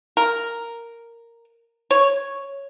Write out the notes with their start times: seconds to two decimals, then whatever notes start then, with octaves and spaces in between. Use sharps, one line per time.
0.17 A#4
1.91 C#5